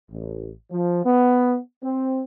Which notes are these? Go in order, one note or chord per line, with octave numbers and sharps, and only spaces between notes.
A1
F3
B3
C4